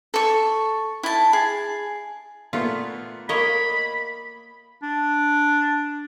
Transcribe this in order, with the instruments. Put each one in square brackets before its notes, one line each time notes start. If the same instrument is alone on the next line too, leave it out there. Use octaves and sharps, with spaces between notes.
[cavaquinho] A4 C#6
E4 A5
G#4
[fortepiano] A#2 A3 B3 [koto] F4
[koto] A#3 C#5 D#5 [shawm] B5
[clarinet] D4